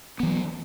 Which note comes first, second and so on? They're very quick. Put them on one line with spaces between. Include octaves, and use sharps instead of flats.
B3 E3 F#3